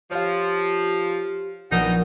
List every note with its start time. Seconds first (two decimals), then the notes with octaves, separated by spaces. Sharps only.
0.11 F3 G4 C#5 F5
1.71 A#1 B2 F#3 D#4 F#5